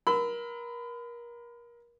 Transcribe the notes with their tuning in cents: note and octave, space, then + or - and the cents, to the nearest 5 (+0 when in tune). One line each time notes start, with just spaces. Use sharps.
A#4 +30 B5 +35 E6 -10